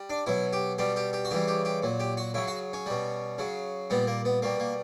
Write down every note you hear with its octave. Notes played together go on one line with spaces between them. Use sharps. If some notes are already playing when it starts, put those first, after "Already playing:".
Already playing: G3
D4
B2 F#3 E4
G4
B2 G3 G4
G4
G4
F#4
C#3 E3 G3 G4
G4
G4
A#2 F#3
G4
F#4
C#3 F#3 E4
F#4
C#4
B2 G3
C#3 F#3
A#2 G3 B3
A#3
B3
B2 G3 A#3
A#3